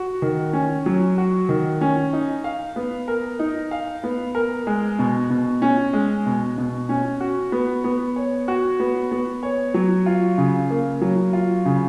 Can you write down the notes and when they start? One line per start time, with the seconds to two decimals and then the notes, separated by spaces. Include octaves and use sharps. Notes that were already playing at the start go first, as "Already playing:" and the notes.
Already playing: F#4
0.22 D#3
0.53 C#4
0.86 F#3
1.18 F#4
1.49 D#3
1.81 C#4
2.13 D#4
2.44 F5
2.76 B3
3.08 A#4
3.39 D#4
3.71 F5
4.04 B3
4.35 A#4
4.67 G#3
4.99 B2
5.30 B2
5.62 C#4
5.93 G#3
6.26 B2
6.58 B2
6.89 C#4
7.20 F#4
7.52 B3
7.84 B3
8.16 C#5
8.48 F#4
8.80 B3
9.11 B3
9.43 C#5
9.74 F#3
10.06 F4
10.38 C#3
10.70 A#3
11.01 F#3
11.33 F4
11.65 C#3